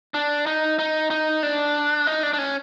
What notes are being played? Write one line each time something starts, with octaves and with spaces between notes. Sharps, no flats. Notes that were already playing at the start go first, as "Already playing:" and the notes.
D4
D#4
D#4
D#4
D4
D#4
D4
D4
C#4